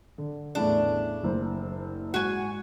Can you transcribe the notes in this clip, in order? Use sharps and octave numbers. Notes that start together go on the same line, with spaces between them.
D3
E2 A2 C#3 D4
F#1 C5
G#2 F#4 G#5